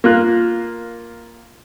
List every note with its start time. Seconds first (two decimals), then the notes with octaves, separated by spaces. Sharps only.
0.04 A#3 F4 F#6